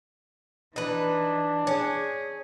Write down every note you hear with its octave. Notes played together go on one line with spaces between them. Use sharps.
E3 D4 D#4 B4
C#4 G#4